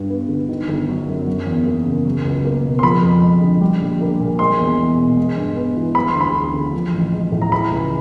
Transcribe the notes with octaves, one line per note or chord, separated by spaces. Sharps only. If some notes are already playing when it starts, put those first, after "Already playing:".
Already playing: G2 G3
B3
D3
D#3
G1
F#3
F#2
F#3
E2
A#3
C#3
F#3
C#2
A#3
B2
C6
F3 B5
F2
G#3
D3
G3
A#1
A#3
A#2
G#3 C6
E2
E2
B2
G#3
G2
B3
E3
F#3 B5
C6
D2
B5
D2
D3
F3
A1
G#3
A2
A#5
E3 B5
C#2